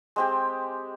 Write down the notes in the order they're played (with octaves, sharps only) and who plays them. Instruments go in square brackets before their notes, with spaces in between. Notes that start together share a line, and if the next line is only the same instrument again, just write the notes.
[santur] G#3 C4 G4